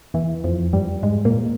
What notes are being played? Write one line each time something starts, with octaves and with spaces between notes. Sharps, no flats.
E2 E3
F2 F3
G2 G3
G#2 G#3
A#2 A#3